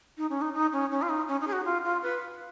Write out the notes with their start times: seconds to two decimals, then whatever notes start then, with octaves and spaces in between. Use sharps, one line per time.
0.18 D#4
0.30 C#4
0.42 D#4
0.54 D#4
0.73 C#4
0.91 C#4
1.02 F4
1.09 D#4
1.28 C#4
1.41 D#4
1.47 G#4
1.53 F#4
1.65 F4
1.84 F4
2.03 B4